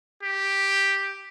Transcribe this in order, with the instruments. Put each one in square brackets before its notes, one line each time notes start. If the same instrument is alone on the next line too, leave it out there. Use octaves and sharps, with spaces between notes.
[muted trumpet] G4